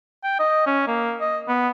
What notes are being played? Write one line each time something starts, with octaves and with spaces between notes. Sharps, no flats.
G5
D#5
C#4
A#3
D#5
B3